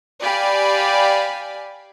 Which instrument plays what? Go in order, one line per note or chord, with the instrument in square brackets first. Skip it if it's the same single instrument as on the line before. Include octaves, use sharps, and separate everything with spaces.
[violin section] G4 D5 F5 G#5 B5